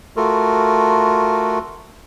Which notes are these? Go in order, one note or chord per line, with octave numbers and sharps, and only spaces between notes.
A3 F4 F#4 A4 A#4